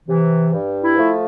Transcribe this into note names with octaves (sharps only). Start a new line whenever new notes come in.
C3 E3
G2
E4
F3 A3